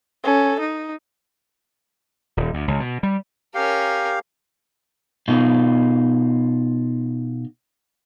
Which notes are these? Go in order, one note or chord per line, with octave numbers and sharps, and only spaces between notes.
C#4 A4
D#4
D#1
D2
C#2
B2
G3
C#4 G4 A#4 F5
B2 D#4 F4